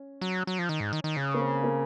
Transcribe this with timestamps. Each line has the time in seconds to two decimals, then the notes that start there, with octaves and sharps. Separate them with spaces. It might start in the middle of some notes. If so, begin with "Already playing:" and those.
Already playing: C#4
0.21 F#3
0.47 F#3
0.59 F3
0.69 D#3
0.80 G#2
0.93 D#3
1.04 D#3
1.16 C#3 C#4
1.34 A#3
1.40 C4
1.64 A#3